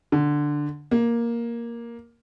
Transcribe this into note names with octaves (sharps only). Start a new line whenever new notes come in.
D3
A#3